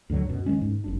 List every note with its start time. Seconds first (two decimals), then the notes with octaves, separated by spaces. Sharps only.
0.09 D2 G2 D3 F#3
0.29 F#2 B2
0.46 D#3 F3 G#3 C#4
0.61 G#2
0.84 G1 F#2 D4